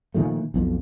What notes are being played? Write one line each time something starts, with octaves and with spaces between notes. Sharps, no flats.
A#2 D#3 F3 A3
B1 F2